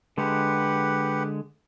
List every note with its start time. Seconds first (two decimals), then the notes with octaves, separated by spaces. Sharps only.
0.18 D3 G#3 G4 B4 F#5